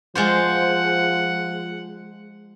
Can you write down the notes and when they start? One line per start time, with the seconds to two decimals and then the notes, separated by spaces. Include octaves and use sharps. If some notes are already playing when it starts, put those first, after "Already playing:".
0.15 F3 G#3 F4 C5 F#5